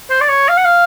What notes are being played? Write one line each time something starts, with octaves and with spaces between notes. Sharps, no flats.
C5
D5
C#5
F5
F#5
F5